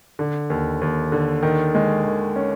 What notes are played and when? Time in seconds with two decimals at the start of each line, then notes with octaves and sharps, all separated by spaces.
0.19 D3
0.50 D#2
0.81 D#2
1.12 D3
1.43 D#3
1.75 G#3
2.05 D#3
2.36 C#4